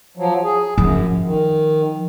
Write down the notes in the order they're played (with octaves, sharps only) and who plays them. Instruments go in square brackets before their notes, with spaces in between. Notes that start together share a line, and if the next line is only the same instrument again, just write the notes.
[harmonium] F3 F#3
G#4
[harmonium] F#2 [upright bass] F3
[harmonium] D#3